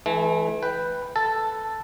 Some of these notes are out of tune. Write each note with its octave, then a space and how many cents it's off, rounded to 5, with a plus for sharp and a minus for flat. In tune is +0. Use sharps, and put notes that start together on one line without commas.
E3 +0 A3 -40
B4 +0 G5 +0
A4 +0 A5 +5